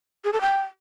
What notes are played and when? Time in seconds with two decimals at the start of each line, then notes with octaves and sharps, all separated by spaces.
0.25 G#4
0.33 A4
0.41 G5